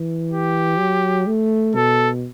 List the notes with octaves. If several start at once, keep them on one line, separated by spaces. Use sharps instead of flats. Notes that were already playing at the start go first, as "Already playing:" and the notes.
Already playing: E3
G4
F#3
A3
B2 A4